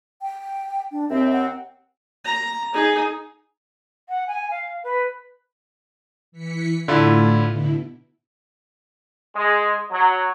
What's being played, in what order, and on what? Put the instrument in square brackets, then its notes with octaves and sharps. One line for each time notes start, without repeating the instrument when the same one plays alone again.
[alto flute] G5
D4
[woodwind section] D#2 C4 [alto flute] E5
[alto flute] F#5
[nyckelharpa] A#5
D#4 G#4
[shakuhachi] F#5
G#5
F5
B4
[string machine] E3 B6 C#7
[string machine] A2 [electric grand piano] D3 E4 F4
[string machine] B2 D3 E4
[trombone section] G#3
F#3